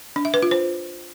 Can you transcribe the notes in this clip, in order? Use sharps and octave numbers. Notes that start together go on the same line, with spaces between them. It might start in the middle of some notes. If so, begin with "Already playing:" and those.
D4
E5
B4
F4
C5